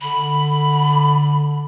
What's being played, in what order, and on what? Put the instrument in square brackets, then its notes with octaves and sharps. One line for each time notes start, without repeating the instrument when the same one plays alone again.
[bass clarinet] D3 [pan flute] B5